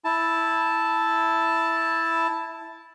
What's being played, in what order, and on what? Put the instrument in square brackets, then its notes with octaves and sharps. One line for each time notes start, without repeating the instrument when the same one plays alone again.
[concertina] E4 A5